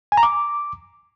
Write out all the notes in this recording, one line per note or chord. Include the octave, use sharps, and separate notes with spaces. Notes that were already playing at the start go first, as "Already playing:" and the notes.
G#5
A#5
D6